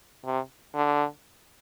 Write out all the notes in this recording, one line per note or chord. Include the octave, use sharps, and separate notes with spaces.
C3
D3